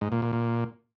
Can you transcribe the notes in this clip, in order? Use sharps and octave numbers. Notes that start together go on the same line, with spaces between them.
G#2
A#2
A#2
A#2